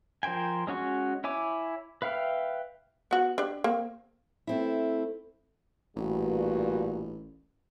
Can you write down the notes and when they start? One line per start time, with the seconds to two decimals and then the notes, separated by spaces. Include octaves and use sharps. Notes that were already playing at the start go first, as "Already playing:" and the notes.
0.23 F3 A#4 C5 G5 G#5
0.67 G#3 C#4 F#4 C#6
1.24 E4 C#5 G#5 D6
2.02 B4 E5 F5 G5 F6
3.11 B3 F#4
3.38 D4 G4 D5
3.64 A#3 C4
4.47 A3 C4 E4
5.96 A1 G2 A#2 F#4